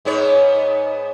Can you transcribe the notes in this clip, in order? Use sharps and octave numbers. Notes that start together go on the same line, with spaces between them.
G#2 B3 C#5